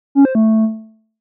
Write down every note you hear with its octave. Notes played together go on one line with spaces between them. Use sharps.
C#4
C5
A3